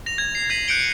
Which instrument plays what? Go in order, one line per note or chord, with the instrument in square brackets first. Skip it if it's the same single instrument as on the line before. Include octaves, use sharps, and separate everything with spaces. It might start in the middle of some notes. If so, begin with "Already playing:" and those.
[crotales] A#6 F7
G#6
C7
G#6 B6 C7 D#7 F#7
F#6 G6 C#7 D7 G7